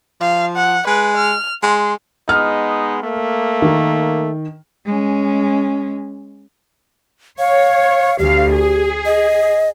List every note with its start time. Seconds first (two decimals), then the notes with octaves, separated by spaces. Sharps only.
0.21 F3 F5
0.56 F#5
0.87 G#3 B4
1.17 F6
1.63 G#3 C6
2.29 G#3 B3 D#4 F6
3.03 A3 A#3
3.62 D#3
4.85 G#3 C#4
7.39 C#5 F5
8.19 D2 G4 F5
8.53 G#4
9.06 D#5